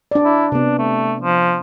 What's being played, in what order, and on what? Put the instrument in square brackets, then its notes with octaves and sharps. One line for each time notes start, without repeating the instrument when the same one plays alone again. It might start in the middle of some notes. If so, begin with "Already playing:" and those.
[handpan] D4 D5
[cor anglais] E4
[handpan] C3 B3 [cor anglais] D4
[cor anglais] A3
F3